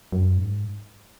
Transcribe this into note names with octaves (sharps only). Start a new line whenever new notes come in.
F#2
G#2